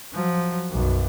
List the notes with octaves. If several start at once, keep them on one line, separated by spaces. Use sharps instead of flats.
F3 F#3
B1 F#2